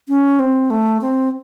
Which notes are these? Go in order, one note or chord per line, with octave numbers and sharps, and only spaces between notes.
C#4
C4
A3
C4